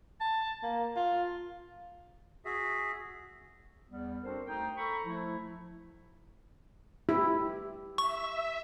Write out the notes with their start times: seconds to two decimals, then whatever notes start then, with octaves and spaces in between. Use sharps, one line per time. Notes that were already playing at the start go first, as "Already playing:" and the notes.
0.21 A5
0.63 A#3
0.96 F4
2.45 F#4 G#4 E5
3.89 E2 G3 B3
4.23 C4 D4 F#4 A4 A#4 C5
4.46 D2 D#4 C5 G5
4.77 A4 A#5 B5 C#6
5.04 F3 A3 E4
7.09 E4 G4
7.98 E5 C#6